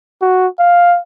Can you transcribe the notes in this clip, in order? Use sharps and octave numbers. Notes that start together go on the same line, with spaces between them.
F#4
F5